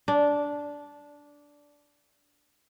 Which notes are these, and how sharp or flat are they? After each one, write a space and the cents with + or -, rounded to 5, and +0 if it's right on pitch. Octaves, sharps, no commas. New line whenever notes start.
D4 -10